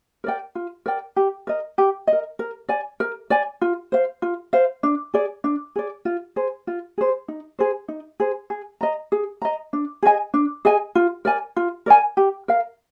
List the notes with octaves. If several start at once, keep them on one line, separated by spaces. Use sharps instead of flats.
A#4 D5 G5
F4
A#4 D5 G5
G4
A#4 D#5
G4
D#5
A#4
A#4
D5 G#5
A#4
D5 G#5
F4
C5 F5
F4
C5 F5
D4
G#4 D5
D4
G#4 D5
F4
G#4 C5
F4
G#4 C5
D#4
G#4 C5
D#4
G#4 C5
G#4
D#5 A#5
G#4
D#5 A#5
D4
G#4 D#5 G#5
D4
G#4 D#5 G#5
F4
A#4 D5 G#5
F4
A#4 D5 G#5
G4
A#4 F5